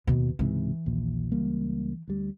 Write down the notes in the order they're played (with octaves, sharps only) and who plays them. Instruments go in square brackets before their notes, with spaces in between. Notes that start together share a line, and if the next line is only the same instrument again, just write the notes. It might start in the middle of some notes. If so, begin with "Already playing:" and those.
[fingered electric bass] D#2 [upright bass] B2
[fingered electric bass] C#2 G#2 C3 [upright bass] E3
[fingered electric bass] A#1 D#2 A#2
C#2 G3 A#3
D2 G3